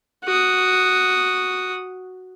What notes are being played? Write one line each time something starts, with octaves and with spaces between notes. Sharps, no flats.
F#4 D#6